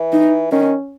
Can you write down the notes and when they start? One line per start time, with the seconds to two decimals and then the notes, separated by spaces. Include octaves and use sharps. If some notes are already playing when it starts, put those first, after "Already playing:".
Already playing: E3
0.13 D#4
0.52 D#3 C#4